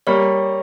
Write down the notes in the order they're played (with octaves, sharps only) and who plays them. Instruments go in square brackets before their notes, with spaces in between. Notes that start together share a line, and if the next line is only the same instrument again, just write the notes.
[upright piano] G3 A#3 [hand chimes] C#5 C#6